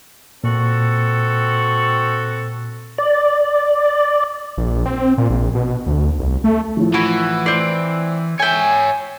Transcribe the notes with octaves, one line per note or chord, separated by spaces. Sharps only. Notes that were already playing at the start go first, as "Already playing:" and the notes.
A#2 C4 F#4 A4
D5
A#1
C4
A#2
A#1
B2
D2
C2
A3
A2 F3
E3 E4 F#4
C4 D5 C7
C#5 E5 G5 G#5